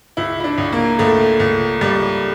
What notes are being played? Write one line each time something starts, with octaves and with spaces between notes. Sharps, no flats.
C#2 E4
E4
D4
C#2
A#3
C#2 A3
C#2
C#2 G3